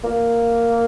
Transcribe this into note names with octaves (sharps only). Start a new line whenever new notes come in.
A#3